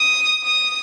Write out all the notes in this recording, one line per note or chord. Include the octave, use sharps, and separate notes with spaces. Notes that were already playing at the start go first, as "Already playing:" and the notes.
Already playing: D#6
D#6